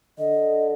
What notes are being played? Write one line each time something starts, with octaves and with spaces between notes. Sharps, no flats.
D3 D#5